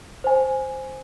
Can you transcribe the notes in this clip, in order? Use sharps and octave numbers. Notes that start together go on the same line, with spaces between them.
C5 G#5